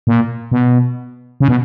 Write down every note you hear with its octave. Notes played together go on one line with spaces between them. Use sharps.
A#2
B2
C#3
B2